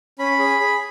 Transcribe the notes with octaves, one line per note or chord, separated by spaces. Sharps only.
C#4 B5
G#4
G#4